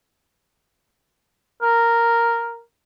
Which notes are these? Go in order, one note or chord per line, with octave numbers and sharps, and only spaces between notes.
A#4